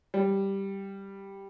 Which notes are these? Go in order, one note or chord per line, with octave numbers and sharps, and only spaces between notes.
G3